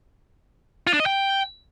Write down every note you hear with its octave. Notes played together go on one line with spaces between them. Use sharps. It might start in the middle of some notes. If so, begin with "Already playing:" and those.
F4
D4
D#5
G5